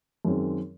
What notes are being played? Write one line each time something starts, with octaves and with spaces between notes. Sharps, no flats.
F#2 D#3 G#3 C4